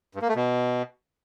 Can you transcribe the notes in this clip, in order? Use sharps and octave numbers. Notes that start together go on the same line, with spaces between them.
G2
A#3
A3
B2